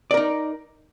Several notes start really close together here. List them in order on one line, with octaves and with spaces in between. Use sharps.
D5 A#4 D#4